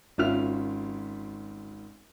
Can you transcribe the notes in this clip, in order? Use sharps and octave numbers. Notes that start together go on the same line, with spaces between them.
G#1 C#4 F4 E5 F6 F7